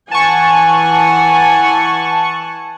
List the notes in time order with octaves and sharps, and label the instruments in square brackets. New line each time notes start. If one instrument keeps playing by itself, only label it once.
[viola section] E3 F#5 G#5 [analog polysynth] A5 C#6